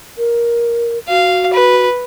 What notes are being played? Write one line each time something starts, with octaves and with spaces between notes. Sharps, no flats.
A#4
F#4 F5
B4